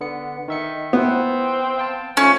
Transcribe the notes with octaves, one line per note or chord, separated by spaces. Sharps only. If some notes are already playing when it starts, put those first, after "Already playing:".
D3 B3 C#7
D#3 D#4 E5 C#7
B3 C4 E4
F5 G5 A5
F3 A3 C#4